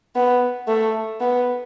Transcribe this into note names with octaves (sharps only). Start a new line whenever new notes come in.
B3
A3
B3